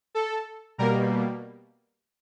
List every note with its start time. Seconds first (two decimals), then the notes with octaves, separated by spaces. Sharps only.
0.15 A4
0.78 B2 G3 A#3 A#4